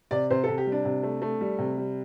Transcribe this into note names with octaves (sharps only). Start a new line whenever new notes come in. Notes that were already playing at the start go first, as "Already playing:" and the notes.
C3 D5
C3 C5
C3 A4
G4
G3
D4
C3
A3
A3
G3
C3
G3